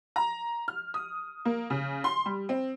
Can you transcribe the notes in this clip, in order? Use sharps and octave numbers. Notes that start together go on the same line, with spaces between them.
A#5
F6
D#6
A#3
C#3
C6
G3
C4